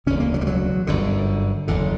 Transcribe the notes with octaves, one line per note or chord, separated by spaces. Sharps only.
E1 D2 C#3 C#4
A#3
F#3
G3
F#3
G1 F#2 D3
F#1 E2 D3